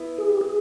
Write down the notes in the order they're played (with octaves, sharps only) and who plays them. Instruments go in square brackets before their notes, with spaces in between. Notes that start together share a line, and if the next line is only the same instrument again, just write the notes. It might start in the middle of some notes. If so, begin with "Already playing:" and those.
Already playing: [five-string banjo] B3 E4
[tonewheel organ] G#4
G4
G#4